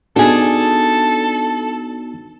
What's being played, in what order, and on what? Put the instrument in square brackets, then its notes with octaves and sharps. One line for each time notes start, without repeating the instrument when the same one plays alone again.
[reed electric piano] B3 D#4 F#4 [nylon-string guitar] D4 G#4 [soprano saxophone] A4